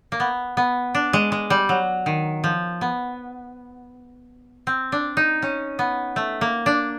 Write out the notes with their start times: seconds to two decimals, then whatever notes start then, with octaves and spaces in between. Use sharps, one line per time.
0.12 A#3
0.20 B3
0.57 B3
0.95 D4
1.13 G#3
1.32 G#3
1.50 G3
1.69 F#3
2.06 D#3
2.44 F3
2.81 B3
4.67 C4
4.92 D4
5.17 D#4
5.42 C#4
5.79 B3
6.16 A3
6.41 A#3
6.66 D4